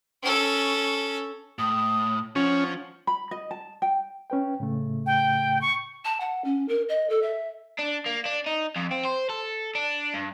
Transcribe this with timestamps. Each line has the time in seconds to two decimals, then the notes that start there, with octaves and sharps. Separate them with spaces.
0.22 C#4 A4
1.59 A2 D#6
2.36 F3 C#4 F#5
3.07 B5
3.31 D#5
3.51 A5
3.82 G5
4.30 C#4 B4 G5
4.60 A2 C#3 A3
5.06 G5
5.62 C#6
6.05 A5
6.20 F#5
6.44 C#4
6.68 A#4
6.89 D#5
7.09 A4
7.22 E5
7.79 D4
8.06 A#3
8.26 D4
8.47 D#4
8.76 F2
8.91 C4
9.05 C5
9.30 A4
9.75 D4
10.14 G2